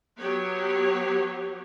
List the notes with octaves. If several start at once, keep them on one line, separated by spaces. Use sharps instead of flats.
F#3 B3 G4 C#5